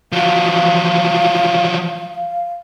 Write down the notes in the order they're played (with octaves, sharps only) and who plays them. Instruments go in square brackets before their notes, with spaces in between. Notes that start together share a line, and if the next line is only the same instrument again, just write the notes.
[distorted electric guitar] F3 F#3 [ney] F5